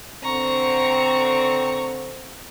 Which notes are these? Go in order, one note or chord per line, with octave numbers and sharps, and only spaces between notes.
D3 C4 A#5 C#6